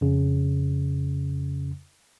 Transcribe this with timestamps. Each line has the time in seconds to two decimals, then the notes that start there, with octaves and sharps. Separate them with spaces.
0.01 F2 C#3